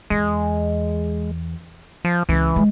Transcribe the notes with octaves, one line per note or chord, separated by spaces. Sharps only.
E2 G#3
F3
C#2 E3
G#3